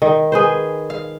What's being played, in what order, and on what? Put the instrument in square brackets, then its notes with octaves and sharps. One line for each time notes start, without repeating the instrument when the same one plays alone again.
[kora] D#3
G#4 B4 C5
F5